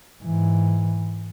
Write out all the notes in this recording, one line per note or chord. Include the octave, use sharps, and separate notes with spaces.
G#2 E3